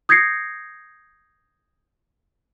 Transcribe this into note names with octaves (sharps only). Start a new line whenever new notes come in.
D#6 G6 G#6 A#6 C7 C#7